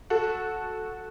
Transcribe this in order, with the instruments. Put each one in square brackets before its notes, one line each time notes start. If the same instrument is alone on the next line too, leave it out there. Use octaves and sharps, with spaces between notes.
[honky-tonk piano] F#4 A4